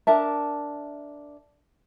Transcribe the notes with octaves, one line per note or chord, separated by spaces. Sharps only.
D4 A#4 E5 A5